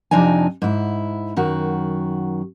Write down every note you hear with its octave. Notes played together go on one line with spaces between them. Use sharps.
F2 C3 F3 D4 D#4 G#5
G#2 E4
F#2 D#3 F#4